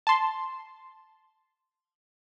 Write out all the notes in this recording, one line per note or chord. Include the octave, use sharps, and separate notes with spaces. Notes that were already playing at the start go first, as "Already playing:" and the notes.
A5 C6